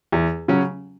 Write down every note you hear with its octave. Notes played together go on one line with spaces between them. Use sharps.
E2
C#3 F#3 C#4